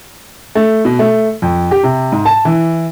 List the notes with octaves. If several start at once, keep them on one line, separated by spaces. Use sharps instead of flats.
A3
B2
A3
F2
G4
C3
G#2
A5
E3